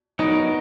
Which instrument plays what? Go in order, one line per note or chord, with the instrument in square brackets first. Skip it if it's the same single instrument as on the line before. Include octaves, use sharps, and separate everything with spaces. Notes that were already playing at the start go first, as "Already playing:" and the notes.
[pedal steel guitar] F#3 B3 F#4 A#4 [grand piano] D#4